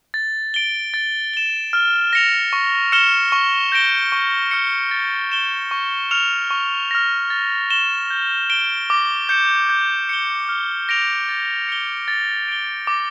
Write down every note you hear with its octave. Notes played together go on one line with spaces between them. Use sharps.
A6
D7 G7
A6
E7 G7
F6
A#6 C#7 F7
C#6
F6 C#7 E7 G7
C#6
G6 A#6 D7 G7
C#6
F6 C#7
A6
E7 G7
C#6
F6 C#7 F7
C#6
F6 A#6
A6
E7 G7
G6
D7 G7
D6
G6 C#7 E7
G6
C#7 G7
F6
A#6 D7 F7
A6
C#7 G7
A6
D7 G7
D6